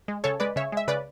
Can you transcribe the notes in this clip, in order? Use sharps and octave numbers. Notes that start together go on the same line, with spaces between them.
G#3
C#3 A4 C#5
G#3 B4 D5
C#3 C#5 E5
G#3 E5
C#3 B4 D5